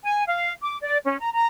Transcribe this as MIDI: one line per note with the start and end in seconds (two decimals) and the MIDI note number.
0.03 0.23 80
0.26 0.50 77
0.61 0.76 86
0.81 0.97 74
1.05 1.19 61
1.20 1.29 82
1.33 1.46 82